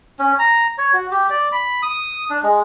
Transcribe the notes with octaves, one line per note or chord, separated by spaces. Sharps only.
C#4
A#5
C#5
F#4
G4
D5
B5
D#6
D4
G#3